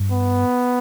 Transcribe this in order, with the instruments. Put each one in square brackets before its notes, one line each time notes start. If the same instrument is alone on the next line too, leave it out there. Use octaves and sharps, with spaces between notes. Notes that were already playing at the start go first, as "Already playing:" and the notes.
Already playing: [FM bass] G2
[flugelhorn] B3